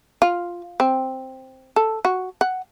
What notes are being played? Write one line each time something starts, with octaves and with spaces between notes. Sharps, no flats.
F4
C4
A4
F#4
F#5